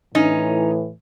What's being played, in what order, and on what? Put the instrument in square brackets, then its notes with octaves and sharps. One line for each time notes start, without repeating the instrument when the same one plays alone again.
[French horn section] A2 E3 [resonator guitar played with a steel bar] C#4 D#4